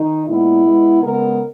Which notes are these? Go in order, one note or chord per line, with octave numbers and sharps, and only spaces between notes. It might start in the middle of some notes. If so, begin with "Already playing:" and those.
Already playing: D#3 D#4
A#2 G#3 B3 E4
B2 G#3 B3
C#3 G#3 B3 A#4